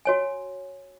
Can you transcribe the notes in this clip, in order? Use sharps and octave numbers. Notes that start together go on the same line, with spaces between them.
F#4 C#5 G#5